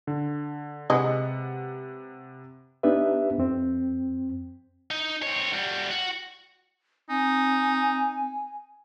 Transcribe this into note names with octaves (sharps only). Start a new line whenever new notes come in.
D3
C3 G#3 B4 D#5 F#5
B3 D4 D#4 G4 B4 E5
F2 C4
D#4
C4 C#5
G3 F#4
F#4
C4 D#4 G#5